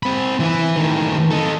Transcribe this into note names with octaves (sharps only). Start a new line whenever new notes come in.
C4 B5
E3 B4
A2 D#3
A4 D#5